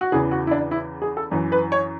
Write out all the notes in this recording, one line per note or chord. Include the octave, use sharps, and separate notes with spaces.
F#4
E2 C#3 E3 G#4
F#4
E4
D4
E4
G#4
A4
F#2 E3
B4
C#5